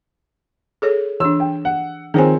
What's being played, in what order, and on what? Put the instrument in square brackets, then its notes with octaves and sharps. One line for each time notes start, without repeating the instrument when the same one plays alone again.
[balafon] G#4 A4 C#5
[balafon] E3 D4 [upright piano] E6
[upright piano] G5
F#5
[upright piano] D#3 F3 C4 [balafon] G#4 C#5 G#5